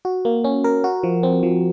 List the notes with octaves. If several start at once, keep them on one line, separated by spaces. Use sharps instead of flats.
F#4
A#3
C#4
A#4
F#4
F3
C4
F3